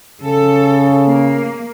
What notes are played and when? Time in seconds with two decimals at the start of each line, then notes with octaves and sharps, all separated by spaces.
0.23 C#3 A4
1.08 A#3